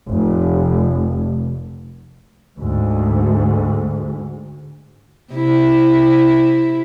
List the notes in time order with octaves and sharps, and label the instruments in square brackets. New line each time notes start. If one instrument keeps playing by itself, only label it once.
[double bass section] F1
D2 G#2
[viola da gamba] C3 E4